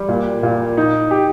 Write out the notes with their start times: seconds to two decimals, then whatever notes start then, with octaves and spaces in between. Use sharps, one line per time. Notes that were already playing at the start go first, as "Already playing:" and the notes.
Already playing: G3
0.09 A#2
0.43 A#2
0.77 D#4
1.11 G4